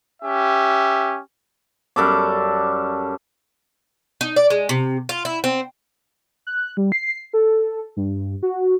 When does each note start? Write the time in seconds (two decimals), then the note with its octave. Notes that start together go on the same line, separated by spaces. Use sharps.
0.22 C#4 G4 E5
1.96 F#2 G3 A4 D6
4.21 D#4
4.36 D5
4.50 G#3
4.69 C3
5.09 F4
5.25 E4
5.44 C4
6.47 F#6
6.77 G3
6.92 C7
7.33 A4
7.97 G2
8.43 F#4